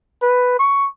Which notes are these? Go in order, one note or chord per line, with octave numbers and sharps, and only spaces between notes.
B4
C#6